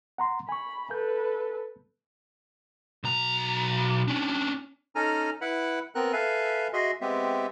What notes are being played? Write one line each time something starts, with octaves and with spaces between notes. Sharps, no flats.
F#5 A#5 C6
G#5 B5 C#6
A4 B4 G6
B1 A#5
C#4 D4
C#4 D#4 A4 G#5 A#5 F6
E4 B4 F#5 B5
B3 C4 A#4 F#6
A4 B4 E5 F5 G#5
F#4 G#4 D#5 E5 C6
G#3 B3 C4 G4 E5